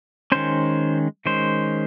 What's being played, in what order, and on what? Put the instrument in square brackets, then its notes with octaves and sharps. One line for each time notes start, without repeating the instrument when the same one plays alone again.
[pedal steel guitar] D#3 G#3 C#4 C5
D#3 G#3 C#4 C5